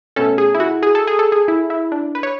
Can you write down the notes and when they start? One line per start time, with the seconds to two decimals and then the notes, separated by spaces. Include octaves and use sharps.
0.16 B2 A3 C#4 A4
0.38 G#4
0.54 E4
0.60 F#4
0.82 G#4
0.95 A4
1.07 G#4
1.19 A4
1.32 G#4
1.48 E4
1.70 E4
1.92 D4
2.15 B4
2.23 C#5